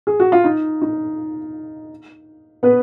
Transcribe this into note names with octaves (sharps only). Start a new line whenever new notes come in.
G#4
F#4
F4
D#4
D#4
B3 B4